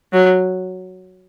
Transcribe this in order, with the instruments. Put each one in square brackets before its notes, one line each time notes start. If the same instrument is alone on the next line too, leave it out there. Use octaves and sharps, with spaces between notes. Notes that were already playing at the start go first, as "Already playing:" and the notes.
[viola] F#3